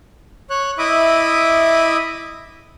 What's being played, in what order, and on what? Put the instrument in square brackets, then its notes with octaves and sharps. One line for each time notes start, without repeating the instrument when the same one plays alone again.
[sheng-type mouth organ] C#5 F#6
E4 D#5 E5 B5 D6 D#6